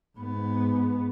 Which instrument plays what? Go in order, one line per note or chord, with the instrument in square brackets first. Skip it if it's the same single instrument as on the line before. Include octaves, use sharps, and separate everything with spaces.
[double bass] G#2 B3